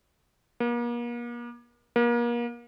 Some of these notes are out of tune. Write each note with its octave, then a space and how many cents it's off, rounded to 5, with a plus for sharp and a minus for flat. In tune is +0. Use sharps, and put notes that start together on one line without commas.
A#3 +40
A#3 +35